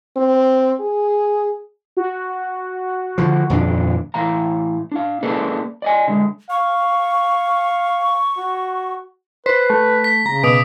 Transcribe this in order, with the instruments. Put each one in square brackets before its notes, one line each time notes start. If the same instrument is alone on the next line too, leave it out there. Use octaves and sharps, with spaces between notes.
[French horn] C4
G#4
[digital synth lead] F#4
[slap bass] D3 F3
D#1 F2 D4
[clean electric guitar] A2 E3 F5 A#5
D4 F5
A#3 C#4 G#4 A4 B4 D5
D5 D#5 G#5
D3 G#3
[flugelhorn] F5 [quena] C#6
[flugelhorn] F#4
[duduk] B4 [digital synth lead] C5 [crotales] B6
[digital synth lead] A3
[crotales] B6
[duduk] C#3 [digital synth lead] A#5
[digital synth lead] B2 [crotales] D6 D#6 D7